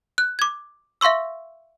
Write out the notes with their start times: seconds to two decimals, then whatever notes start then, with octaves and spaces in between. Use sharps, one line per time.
0.18 F#6
0.39 D6 G#6
1.01 E5 F5 C6 C#6 E6